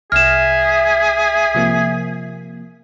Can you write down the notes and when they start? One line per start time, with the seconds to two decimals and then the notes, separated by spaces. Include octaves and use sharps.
0.12 C2 G#4 E5 F6 A#6 E7
1.54 C3 F3 A#3